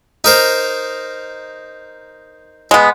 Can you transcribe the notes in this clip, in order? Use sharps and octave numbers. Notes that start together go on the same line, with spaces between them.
D#4 A#4 C5
G#3 B3